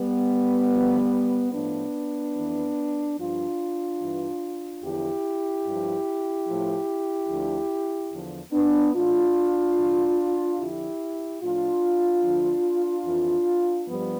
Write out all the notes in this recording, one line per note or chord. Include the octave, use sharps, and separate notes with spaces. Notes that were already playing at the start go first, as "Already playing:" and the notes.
Already playing: G3 B3
D2 D3 F3
A2 F3 B3 D4
F2 E3
G2 F3 D4 F4
G2 E3
E2 D3 F3 E4 G4
G2 F3
A2 F3
D2 D3 F3
E2 D3 F3
B3 D4
A2 E3 D4 F4
G2 E3
F2 D3 F3 E4 G4
A2 F3 D4 F4
D2 D3 F3
F2 E3
G2 F3 G3 B3